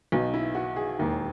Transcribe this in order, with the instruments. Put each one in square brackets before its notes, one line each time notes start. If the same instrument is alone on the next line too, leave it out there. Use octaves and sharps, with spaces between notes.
[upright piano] B1 B2 D#4
E4
F#4
G#4
E1 D#2 D#3